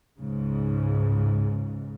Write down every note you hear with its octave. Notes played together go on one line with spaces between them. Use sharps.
C#2 G#2 C#3